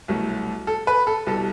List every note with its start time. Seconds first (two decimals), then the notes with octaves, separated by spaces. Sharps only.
0.08 C2 B2 F#3 A3
0.67 A4
0.87 B4
1.07 A4
1.27 C2 B2 G3 A4